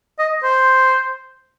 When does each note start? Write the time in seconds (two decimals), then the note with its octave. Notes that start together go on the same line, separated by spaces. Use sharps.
0.19 D#5
0.44 C5